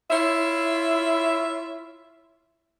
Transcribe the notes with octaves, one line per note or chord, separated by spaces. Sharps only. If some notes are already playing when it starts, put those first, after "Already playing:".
E4 F4 C#5 E5